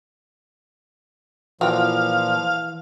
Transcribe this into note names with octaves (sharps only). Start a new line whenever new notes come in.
A#2 E3 F3 F4 F#4 F5 G5